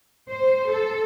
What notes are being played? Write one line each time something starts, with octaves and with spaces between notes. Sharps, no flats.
C5
A4